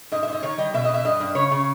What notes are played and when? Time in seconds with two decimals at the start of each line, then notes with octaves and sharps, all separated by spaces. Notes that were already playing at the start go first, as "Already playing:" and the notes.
0.12 G#2 D#5
0.23 E5
0.28 G#2 D#5
0.43 D#3 C#5
0.58 G3 D#5
0.74 B2 E5
0.84 D#5
0.89 B2
0.94 E5
1.05 G2 D#5
1.20 G2
1.35 C#3 C#5
1.51 C#3